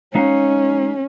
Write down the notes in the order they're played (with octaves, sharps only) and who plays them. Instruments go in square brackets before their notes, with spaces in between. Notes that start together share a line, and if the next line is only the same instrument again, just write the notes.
[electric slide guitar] G#3 D#4 F5 [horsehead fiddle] C#4